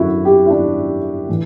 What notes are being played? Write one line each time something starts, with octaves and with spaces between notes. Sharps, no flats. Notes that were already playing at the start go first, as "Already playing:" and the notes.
Already playing: F#2 D3 E4 F#4
G4
E4
D4
A2 E3